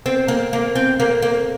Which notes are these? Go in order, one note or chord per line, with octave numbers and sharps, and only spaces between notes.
C4
A#3
A#3
C4
A#3
A#3